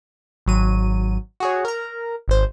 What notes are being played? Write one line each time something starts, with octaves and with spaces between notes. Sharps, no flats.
G#1 F#3 D#7
F#4 G#4 C#5
A#4 A#5
G#1 C5